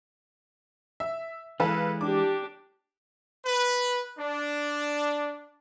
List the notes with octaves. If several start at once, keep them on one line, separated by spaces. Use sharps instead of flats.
E5
E3 G#3 A4 B4 F5
D4 G4 D6
B4
D4